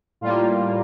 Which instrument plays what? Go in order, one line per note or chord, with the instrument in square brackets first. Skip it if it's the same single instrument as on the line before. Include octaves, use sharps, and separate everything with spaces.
[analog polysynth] A2 G3 A#3 F4